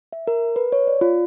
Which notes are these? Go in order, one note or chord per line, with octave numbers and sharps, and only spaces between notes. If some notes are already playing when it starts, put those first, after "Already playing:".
E5
A#4
B4
C#5
D5
F4